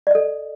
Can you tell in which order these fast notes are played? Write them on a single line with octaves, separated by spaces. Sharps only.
D5 D#5 A4